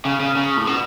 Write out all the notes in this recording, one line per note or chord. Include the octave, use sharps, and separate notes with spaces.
C#3
C#3
C#3
A2
B2